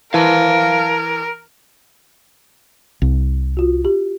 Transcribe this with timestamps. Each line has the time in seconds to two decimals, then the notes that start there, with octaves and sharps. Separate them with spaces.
0.14 E3 A#4 F5 A5
3.02 C2
3.57 F4 F#4
3.85 G4